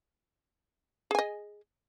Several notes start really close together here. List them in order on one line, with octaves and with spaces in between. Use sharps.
G#4 G#5 D#5